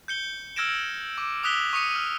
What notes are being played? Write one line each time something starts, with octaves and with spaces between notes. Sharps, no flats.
G6 C#7 G7
E6 F6 G#6 A#6 D7 E7
D6
D#6 E6 F#6 B6 F7 G7
C#6 D#6 C#7 D#7
F6